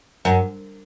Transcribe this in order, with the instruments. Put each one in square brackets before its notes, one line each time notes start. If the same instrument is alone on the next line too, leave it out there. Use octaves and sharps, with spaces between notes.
[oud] F#2